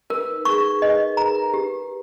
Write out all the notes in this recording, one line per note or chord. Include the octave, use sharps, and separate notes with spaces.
A#4 B4
D#4
G#4 C#6
A#4
B4 D#5
B4
A#4 A#5
A#4
G4 B4